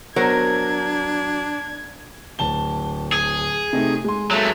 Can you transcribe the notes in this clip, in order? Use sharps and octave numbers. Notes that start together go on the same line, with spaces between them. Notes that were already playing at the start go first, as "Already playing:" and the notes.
F#3 B3 D4 A#4 C5 C#5 G#6
D1 A5 G7
G#4
C3 A3 D#4
G#3 C6
F#3 A3